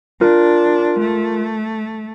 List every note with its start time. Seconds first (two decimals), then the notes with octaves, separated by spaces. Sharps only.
0.21 D4 F4 A#4
0.99 A3